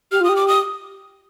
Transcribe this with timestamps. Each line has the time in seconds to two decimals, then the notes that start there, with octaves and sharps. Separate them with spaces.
0.12 G4 F6
0.21 F4
0.24 G4 D#6
0.36 D6
0.48 D#6